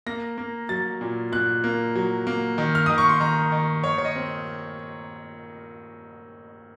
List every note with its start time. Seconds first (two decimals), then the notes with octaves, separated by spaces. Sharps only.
0.06 A#3 A#6
0.38 A#3
0.69 F#3 A6
1.01 A#2
1.32 A#2 F#6
1.64 A#3
1.95 F#3
2.27 A#3
2.58 D#3
2.75 F6
2.86 D#3 D#6
2.98 C#6
3.09 C6
3.20 D#3 A#5
3.52 D#3
3.84 D#3 C#5
3.98 C#5
4.05 D#5
4.15 C4